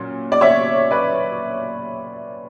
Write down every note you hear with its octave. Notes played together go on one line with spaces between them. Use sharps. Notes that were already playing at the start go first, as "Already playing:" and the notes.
Already playing: A#2 F#3 C#4
D5
C#5 E5
B4 D5